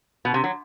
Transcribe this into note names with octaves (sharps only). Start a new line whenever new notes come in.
B2
C3
F#3